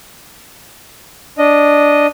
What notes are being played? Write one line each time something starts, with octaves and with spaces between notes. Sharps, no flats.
D4 D#5